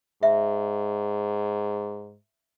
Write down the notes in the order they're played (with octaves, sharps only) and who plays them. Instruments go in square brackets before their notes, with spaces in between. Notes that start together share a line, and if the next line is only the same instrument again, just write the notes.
[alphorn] G#2 [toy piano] E5